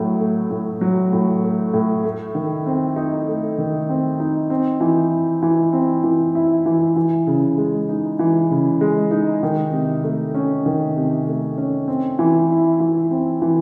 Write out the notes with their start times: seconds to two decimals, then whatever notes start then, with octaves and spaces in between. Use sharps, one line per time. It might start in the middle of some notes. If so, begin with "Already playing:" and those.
Already playing: A2 F#3
0.20 A3
0.50 A2
0.81 F#3
1.13 A2
1.44 A3
1.73 A2
2.04 A3
2.35 D#3
2.66 C4
2.96 D#4
3.28 A3
3.58 D#3
3.89 C4
4.20 D#4
4.50 C4
4.81 E3
5.12 E4
5.42 E3
5.73 C4
6.04 E3
6.35 E4
6.66 E3
6.96 E3
7.27 C#3
7.58 G#3
7.89 D#4
8.19 E3
8.51 C#3
8.81 G#3
9.11 D#4
9.43 D#3
9.73 C3
10.03 A3
10.35 C#4
10.66 D#3
10.96 C3
11.27 A3
11.58 C#4
11.88 C4
12.19 E3
12.50 E4
12.80 E3
13.11 C4
13.42 E3